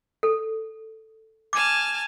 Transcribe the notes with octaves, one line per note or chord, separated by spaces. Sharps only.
A4
G#5 A5 D6 F6